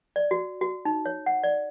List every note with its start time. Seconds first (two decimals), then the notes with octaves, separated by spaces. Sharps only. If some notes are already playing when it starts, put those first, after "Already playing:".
0.16 D5
0.31 F#4
0.61 F#4
0.85 D#4
1.06 C#5
1.26 F#5
1.43 D5